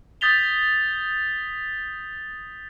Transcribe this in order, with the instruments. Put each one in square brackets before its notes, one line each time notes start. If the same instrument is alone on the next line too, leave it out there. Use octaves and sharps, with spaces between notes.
[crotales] D#6 G6 A6 B6 F7 G7